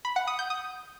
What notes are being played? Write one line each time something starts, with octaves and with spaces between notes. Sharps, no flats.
B5
F#5
D#6
G6
D#6